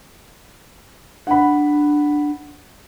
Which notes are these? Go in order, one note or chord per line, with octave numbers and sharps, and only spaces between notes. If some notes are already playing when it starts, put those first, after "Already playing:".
D4 F#5 B5